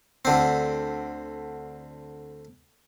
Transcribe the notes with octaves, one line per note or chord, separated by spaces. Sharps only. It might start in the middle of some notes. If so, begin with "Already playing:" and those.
D2 D3 C4